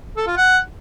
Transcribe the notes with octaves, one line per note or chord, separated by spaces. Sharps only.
A4
F4
F#5